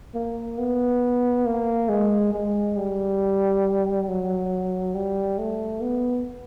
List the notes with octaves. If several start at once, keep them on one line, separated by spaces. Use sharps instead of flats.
A#3
B3
A#3
G#3
G#3
G3
F#3
G3
A3
B3